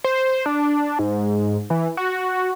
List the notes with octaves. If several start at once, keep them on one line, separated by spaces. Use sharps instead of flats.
C5
D4
G#2
E3
F#4